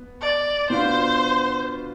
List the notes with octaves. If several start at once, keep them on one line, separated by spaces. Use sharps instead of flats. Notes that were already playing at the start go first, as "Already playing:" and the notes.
Already playing: B3
D5
B2 B3 D4 F4 C5